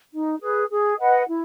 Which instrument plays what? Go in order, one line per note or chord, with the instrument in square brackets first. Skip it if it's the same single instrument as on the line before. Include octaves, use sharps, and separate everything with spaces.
[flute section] D#4
G#4 B4
G#4
B4 D#5 F#5
E4